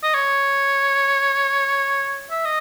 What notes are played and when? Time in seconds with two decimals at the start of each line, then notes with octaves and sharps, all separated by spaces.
0.03 D#5
0.15 C#5
2.31 E5
2.45 D#5